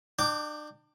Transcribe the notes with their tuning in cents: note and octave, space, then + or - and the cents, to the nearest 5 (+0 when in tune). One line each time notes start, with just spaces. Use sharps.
D4 +40 G5 +0 D6 +0